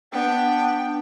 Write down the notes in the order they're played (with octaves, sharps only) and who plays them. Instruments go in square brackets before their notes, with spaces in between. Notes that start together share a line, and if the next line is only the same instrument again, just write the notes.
[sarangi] B3 [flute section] D4 [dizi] G5